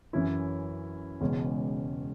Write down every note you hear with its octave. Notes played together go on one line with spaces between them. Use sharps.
F#2 E3 C#4 E4
E1 E2 C#3 G#3 C#4